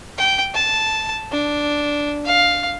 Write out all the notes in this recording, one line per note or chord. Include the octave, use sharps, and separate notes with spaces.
G5
A5
D4
F5